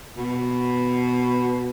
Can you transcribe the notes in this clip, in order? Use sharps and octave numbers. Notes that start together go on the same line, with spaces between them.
B2